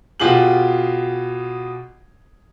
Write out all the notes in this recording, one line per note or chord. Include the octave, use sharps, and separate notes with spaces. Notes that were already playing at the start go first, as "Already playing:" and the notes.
B2 F4 G4 G#4 F#7